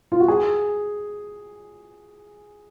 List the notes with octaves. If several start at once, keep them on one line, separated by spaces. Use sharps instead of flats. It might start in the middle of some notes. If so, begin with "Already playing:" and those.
F4
F#4
G#4